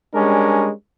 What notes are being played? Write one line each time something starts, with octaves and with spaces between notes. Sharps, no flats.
G3 G#3 C#4 D4 A#4